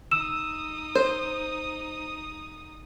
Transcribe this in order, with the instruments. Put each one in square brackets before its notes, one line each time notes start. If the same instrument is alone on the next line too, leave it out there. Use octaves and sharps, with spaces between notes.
[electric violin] D#4 D#6 [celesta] E6 E7
[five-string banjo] C5